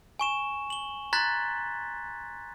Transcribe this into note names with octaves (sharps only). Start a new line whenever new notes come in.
G#5 C#6 E7
F#7 G7
A#5 C6 F#6 G#6 A6 B6